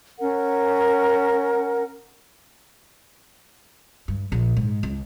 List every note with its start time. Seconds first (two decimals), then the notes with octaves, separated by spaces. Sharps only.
0.19 C#4 A#4 F#5
4.08 G2
4.32 A#1
4.57 G#2
4.83 C#2